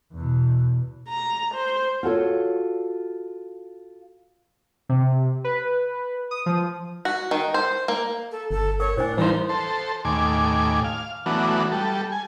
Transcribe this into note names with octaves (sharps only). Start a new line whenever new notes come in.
E2 B2
A#5
C5
F4 F#4 A4 C#5
C3
B4
D#6
F3
F#4
D#3
C5
A#3
A4
G1 A4
A#4 C#5 C#6
A2 D4 C5 G#5
E3 G3 D#4 B4 C5
A4 C5
D#2 A2 G#5 D6
F5
E3 F#3 A3 B3 D4 F#4
G3 A4
G#5